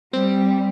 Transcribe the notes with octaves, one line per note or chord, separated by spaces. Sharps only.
G3 C4